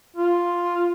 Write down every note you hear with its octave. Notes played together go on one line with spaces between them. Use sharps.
F4